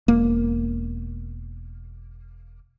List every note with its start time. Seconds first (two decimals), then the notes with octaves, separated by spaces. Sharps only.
0.08 E1 A#3